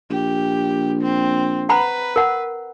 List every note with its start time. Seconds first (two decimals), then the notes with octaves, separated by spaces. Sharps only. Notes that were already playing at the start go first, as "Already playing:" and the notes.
0.10 A#1 G4
1.02 C4
1.69 B4 F#5 A#5 B5
2.16 A#4 F#5